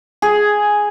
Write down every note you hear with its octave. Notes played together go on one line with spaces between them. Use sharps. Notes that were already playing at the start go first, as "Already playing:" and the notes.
G#4